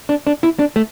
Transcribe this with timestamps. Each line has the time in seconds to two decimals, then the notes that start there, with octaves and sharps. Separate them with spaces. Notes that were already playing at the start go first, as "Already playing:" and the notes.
0.09 D4
0.27 D4
0.43 E4
0.59 D4
0.76 A3